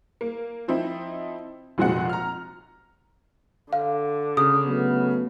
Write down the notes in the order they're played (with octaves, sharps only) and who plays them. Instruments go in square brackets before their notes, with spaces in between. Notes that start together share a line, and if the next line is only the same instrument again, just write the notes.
[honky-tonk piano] A#3
F3 C4 D#4 E4
F1 A#2 G#3 C4 F#4 F#5
A#5 F6
[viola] D3 [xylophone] F5
[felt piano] C#3 [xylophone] D#6
[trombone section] F#3 A3 B3